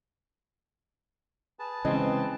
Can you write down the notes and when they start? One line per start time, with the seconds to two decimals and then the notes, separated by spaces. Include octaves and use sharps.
1.59 G#4 B4 A5
1.85 C#3 E3 G#3 C4 D#5